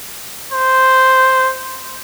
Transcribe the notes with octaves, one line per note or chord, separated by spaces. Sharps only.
C5